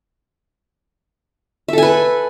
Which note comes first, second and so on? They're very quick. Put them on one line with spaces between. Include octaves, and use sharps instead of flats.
E5 A4 G#5 B4